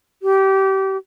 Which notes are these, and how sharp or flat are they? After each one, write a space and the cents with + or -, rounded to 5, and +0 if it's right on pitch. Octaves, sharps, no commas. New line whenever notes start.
G4 -25